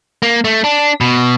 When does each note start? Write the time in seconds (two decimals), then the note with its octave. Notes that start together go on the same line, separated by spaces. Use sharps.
0.23 A#3
0.45 A3
0.64 D4
1.01 B2